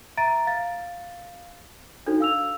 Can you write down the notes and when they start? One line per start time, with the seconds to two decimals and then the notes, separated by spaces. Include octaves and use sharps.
0.17 E5 A#5 A6 D7
0.47 F5 A6
2.06 D4 D#4 F#4 A4 C5
2.20 F5 E6 F7